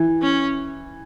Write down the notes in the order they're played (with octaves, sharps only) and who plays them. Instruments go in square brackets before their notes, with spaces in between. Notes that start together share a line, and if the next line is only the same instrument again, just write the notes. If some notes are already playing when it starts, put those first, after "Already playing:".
Already playing: [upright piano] E3
[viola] C#4